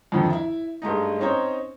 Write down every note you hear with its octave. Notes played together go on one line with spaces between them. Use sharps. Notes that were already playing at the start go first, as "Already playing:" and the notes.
F2 D3 D#3
E4 E5
G2 G#3 A3 D#4
C4 C#4 D#4 C5 C#5